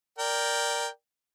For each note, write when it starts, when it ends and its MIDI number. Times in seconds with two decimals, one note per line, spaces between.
0.18 0.88 70
0.18 0.88 74
0.18 0.88 79